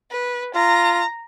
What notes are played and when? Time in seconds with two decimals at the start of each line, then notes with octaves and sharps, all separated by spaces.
0.11 B4
0.55 F4 A#5